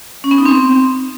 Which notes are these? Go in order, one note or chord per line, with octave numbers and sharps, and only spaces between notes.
C#4
B3
D#4
C4